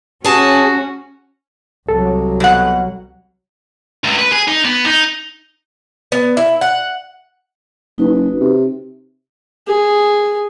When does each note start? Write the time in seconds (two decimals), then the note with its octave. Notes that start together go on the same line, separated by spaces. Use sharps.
0.24 C#4 F#4 G#4 A5
1.89 C2 F#3 A4
2.40 B2 F#5
4.04 C#2
4.18 B4
4.32 G#4
4.47 D#4
4.65 B3
4.86 D#4
6.12 B3
6.37 E4
6.61 F#5
7.98 F#1 D#4 F#4 B4
8.40 C3
9.67 G#4